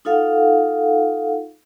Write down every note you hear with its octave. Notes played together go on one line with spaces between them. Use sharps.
D#4 F4 A4 F5 F#5